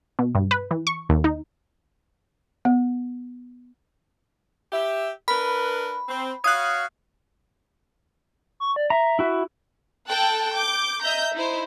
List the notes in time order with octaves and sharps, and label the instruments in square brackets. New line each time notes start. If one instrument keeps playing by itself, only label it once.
[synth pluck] B2
G2
B4
E3
C#6
D#2
D#4
[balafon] B3
[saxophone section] G4 E5
[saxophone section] D4 A#4 B4 [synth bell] B5
[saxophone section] C4
[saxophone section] F#4 C#5 F5 [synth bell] D#6 F#6
[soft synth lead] C#6
D5
[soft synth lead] E5 [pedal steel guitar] A#5
[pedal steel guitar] E4 F#4
[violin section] A4 G5 A5 F#6
D6 G6
D#5 E5 A#5 G6
D#4 E4 C5